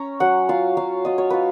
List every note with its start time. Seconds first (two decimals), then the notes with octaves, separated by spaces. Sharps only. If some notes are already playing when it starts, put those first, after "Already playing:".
Already playing: C#4 A#5
0.20 F#3 F#5
0.49 F4 F5
0.77 F#3 F5
1.05 F4 D#5
1.18 C#5
1.30 F4 B4